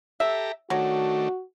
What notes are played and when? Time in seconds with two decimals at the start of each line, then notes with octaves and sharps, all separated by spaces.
0.20 G4 A4 E5 A#5
0.70 D#3 F#3 A3 D4 F#4